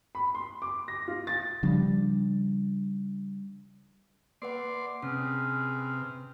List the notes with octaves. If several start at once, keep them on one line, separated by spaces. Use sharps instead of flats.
B5
C6
D6
A#6
F4
A6
C#3 F3 G3 D4
A#3 B4 D5 F#5 C6
C3 C#4 G#4 B4 F6